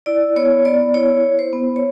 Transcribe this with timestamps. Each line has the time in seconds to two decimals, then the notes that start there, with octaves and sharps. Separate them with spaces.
0.06 E4 D5
0.36 B3 C#5
0.65 B3 D5
0.94 E4 C#5
1.24 E4
1.39 C5
1.53 B3
1.76 C#5